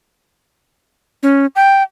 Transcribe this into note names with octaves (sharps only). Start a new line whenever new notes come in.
C#4
G5